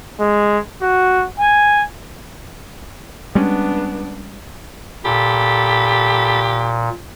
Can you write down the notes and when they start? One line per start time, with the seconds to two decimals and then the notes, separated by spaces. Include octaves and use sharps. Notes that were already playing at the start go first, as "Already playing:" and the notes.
0.20 G#3
0.81 F#4
1.40 G#5
3.35 G3 G#3 B3 C#4 D4
5.05 A#2 G4 A4 B5